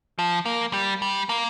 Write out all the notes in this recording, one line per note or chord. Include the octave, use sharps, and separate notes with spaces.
F3
A#3
G3
G3
A#3